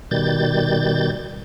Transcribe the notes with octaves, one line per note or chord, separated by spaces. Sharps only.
B2 D#3 G3 G6 A6